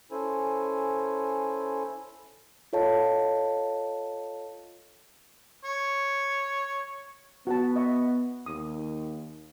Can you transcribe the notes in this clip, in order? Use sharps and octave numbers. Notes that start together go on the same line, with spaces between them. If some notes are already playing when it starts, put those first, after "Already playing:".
C#4 E4 A4 C5 G#5
F4 A4 C#5 D#5 F5 A5
C#5
B3 F#4 F#5 A5
D#5 E5 C#6
D#2 D#6